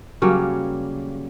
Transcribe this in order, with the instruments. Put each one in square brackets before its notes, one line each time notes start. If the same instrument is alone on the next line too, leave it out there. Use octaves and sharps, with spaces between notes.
[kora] C#3 F#3 G3 A#3